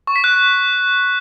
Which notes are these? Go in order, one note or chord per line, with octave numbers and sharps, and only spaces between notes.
C#6
B6
F#6